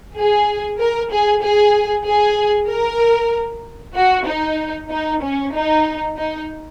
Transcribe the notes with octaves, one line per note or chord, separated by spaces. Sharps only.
G#4
A#4
G#4
G#4
G#4
A#4
F#4
D#4
D#4
C#4
D#4
D#4